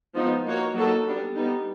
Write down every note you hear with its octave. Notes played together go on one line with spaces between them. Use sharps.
F3 G#3 B3 D#4
A#3 D#4 F#4 A#4 C#5
F#3 A#3 D#4 F#4 A4
G3 B3 D4
G3 B3 D#4